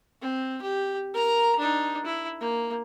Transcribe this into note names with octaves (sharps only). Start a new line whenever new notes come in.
C4
G4
A#4 A#5
D4 D#4
E4
A#3